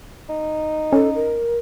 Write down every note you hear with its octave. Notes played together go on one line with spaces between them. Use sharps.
D#4
C#4 A4
A#4